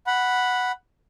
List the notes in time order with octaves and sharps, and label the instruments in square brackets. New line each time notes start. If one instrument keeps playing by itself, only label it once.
[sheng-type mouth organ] F#5 B5